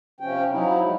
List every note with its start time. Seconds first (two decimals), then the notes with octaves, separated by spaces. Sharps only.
0.20 C3 F3 C#4 G5
0.50 F3 F#3 D#4 E4
0.82 G#3